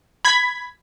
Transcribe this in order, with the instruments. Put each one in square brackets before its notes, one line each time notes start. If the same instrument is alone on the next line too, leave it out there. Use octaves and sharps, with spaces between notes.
[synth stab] B5 G#6 B6